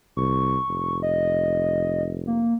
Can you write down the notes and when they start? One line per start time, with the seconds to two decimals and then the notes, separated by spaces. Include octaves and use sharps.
0.17 C2 C#6
0.68 F1
1.03 D#5
2.27 A#3